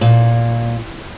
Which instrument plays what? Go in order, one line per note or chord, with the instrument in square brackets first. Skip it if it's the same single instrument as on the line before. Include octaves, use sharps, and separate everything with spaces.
[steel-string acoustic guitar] A#2